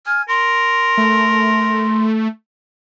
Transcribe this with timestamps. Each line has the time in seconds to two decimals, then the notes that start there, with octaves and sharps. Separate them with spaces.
0.07 G#5 F6
0.28 A#4 C6
0.97 A3